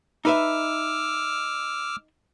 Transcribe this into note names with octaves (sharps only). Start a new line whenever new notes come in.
D#4 B4 E5 D6 E6 F6